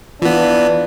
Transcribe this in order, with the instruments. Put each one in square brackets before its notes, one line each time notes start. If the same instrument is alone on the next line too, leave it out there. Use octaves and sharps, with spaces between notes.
[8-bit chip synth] E3 B3 [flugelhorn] D4 [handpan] F4